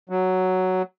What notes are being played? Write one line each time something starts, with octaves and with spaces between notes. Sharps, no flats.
F#3